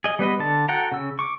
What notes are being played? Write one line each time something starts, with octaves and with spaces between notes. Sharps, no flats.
G#4 D#5
G3 B3 B4 D#5
D3 A5
F#4 A4 F#5 G5 A#5
C#3 E6
C#6 D6